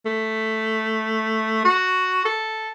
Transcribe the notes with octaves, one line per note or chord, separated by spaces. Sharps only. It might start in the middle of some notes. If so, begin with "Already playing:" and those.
A3
F#4
A4